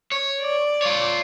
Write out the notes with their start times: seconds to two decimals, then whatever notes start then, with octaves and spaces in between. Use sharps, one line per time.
0.12 C#5
0.41 D5
0.82 F4 C#5